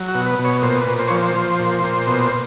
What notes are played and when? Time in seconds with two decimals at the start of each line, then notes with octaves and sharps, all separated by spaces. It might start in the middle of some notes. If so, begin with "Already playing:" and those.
Already playing: F#3
0.08 F#4
0.15 B2
0.26 B4
0.39 B2
0.45 C#5
0.62 A#2 C5
0.81 B4
0.87 A#2
0.99 C5
1.08 F3 C#5
1.17 C5
1.35 F3
1.60 A#2
1.84 A#2
2.07 B2